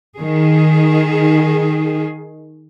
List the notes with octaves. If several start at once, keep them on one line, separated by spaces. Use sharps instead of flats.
D#3 G#4